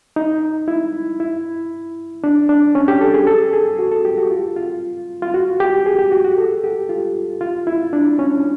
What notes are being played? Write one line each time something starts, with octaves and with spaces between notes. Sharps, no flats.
D#4
E4
E4
D4
D4
C#4
G4
A4
G#4
A4
G#4
F#4
A4
G4
F#4
F4
F4
F4
F#4
G4
G#4
G4
F#4
F#4
A4
G4
F4
F4
E4
D4
C#4